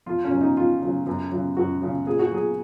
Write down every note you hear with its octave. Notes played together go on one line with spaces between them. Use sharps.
F2 F4
C#4
C#3 F#3
D#4
F2 F4
C#3 F#3
F#2
C#3 F#3
F#2 F#4
C#3 F#3
A#2 G#4
F#4
F#3 G#4